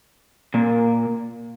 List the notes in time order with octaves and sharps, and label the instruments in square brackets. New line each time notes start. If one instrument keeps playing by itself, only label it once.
[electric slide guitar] A#2 A#3